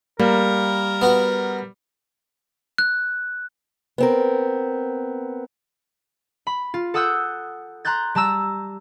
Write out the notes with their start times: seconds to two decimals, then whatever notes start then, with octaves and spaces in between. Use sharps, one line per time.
0.19 G3 A#3 A#4
1.02 B3 F#4
2.78 F#6
3.98 B3 C4 A#4
6.47 B5
6.74 F4
6.94 A4 F#5 D#6 E6 F#6 G6
7.85 A#5 C6 F#6 G6 A6
8.15 G3 A5 A#5 E6 E7